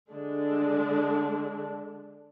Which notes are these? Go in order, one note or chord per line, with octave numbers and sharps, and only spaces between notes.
D3 G#3 D4